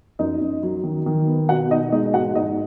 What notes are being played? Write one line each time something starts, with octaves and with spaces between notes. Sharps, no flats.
F#2 D#4 D#5
F#2
F#3
D#3
D#3
B3
B2 F#4 F#5
B2 D#4 D#5
G#3 D#4 D#5
G#2 F#4 F#5
G#2 D#4 D#5